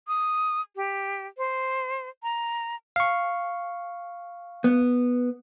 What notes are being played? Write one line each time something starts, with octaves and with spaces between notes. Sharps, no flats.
D#6
G4
C5
A#5
F5 C#6
B3